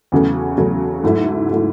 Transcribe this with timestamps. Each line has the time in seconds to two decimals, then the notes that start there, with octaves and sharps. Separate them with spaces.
0.12 E2 C#3 F#3 A3 C#4
0.58 E2 C#3 F#3 A3 C#4
1.04 G#2 F#3 A3 E4
1.51 F#3 A3 E4